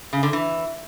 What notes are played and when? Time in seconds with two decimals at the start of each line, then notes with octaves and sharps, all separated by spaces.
0.13 C#3
0.23 D3
0.33 E3